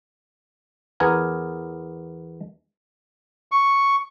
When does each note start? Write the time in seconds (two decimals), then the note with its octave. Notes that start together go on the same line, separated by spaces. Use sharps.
1.00 E2 B3 A#4 G#5 A#5
3.52 C#6